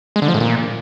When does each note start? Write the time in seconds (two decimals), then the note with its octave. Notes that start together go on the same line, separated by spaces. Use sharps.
0.16 G#3
0.22 D3
0.28 F3
0.34 A2
0.40 A#2